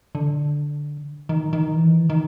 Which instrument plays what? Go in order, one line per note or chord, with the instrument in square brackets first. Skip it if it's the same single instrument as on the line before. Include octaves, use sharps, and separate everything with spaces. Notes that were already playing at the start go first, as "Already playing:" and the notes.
[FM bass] D3
D#3
D#3
E3
D#3